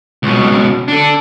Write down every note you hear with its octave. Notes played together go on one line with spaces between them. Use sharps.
C#2 B2
D4 A4